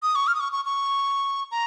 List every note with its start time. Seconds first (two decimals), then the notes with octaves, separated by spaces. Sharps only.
0.03 D#6
0.15 C#6
0.27 F6
0.35 D#6
0.40 C#6
0.52 C#6
0.65 C#6
1.51 A#5